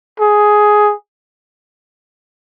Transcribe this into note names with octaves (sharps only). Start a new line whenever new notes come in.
G#4